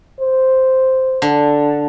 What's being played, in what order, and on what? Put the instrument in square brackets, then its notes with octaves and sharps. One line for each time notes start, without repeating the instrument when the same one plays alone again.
[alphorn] C5
[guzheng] D3